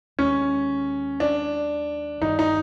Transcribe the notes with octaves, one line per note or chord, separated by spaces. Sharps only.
D#2 D#3 G#3 C#4
D4
G1 G2 D#3 D#4
D#4